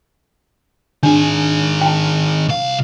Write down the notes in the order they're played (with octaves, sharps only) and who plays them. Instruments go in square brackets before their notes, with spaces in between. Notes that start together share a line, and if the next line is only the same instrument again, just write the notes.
[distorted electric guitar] D#3 G#4 [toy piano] D4
[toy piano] G5 A5
[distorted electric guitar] C2 F5